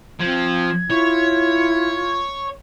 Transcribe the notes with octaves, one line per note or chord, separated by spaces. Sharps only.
F3 C4 G#6
E4 F4 C#5